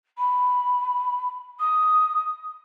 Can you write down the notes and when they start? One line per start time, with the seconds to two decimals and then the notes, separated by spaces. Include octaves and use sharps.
0.17 B5
1.59 D#6